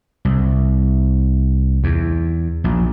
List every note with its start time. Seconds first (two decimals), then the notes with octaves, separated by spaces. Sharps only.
0.25 C2
1.84 E2
2.64 A#1